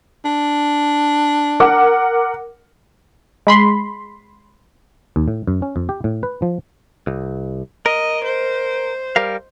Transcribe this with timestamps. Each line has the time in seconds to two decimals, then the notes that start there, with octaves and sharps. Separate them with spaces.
0.25 D4
1.60 A#4 F#5 D6
3.47 G#3 B5 C6
5.16 D#2
5.28 A2
5.47 F#2
5.62 C#4
5.76 F2
5.89 G4
6.04 A2
6.23 B4
6.42 F3
7.07 C2
7.86 A#4 D#5
8.24 C5
9.16 G3 A#4 F5